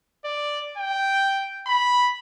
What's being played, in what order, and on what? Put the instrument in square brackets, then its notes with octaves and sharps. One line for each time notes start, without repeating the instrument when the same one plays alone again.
[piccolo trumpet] D5
G5
B5